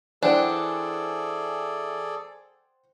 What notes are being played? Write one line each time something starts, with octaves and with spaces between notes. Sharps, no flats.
E3 D4 G#4 A4 C5 D5 F#5 G5